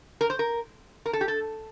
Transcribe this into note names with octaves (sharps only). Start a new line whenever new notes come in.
A#4
C5
A#4
A#4
A4
G4
A4